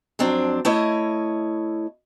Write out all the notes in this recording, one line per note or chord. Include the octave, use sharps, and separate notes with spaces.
F2 F#3 C4 D4
A3 E4 C#5 D#5